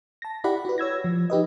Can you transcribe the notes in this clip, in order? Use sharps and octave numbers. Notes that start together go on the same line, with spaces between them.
A5 A#6
E4 G4 D5 F#5 B5
F#4 B4
C#5 E6 G#6 A#6
F3
D#4 G4 B4 D#5